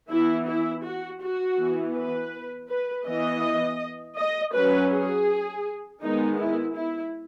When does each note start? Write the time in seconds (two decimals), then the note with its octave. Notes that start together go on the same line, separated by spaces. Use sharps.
0.10 E3 B3 E4
0.47 E4
0.85 F#4
1.21 F#4
1.58 E3 B3
1.95 B4
2.69 B4
3.06 E3 B3 D#5
4.17 D#5
4.53 F#3 C#4 B4
4.91 G#4
6.02 D#3 G#3 B3 D#4
6.39 E4
6.75 E4